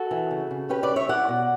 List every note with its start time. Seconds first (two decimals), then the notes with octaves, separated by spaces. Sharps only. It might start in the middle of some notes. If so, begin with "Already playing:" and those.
Already playing: F#4 A4
0.11 E3
0.31 C#3
0.51 C#3
0.69 C#4 G4 B4
0.83 B4 D5
0.89 G3
0.96 C#5 E5
1.09 E4 D5 F#5
1.29 B2